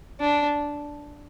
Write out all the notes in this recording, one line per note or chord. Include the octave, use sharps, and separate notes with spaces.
D4